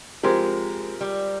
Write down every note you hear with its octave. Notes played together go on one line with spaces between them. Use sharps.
F3 G#3 C4 G4 A#4
G3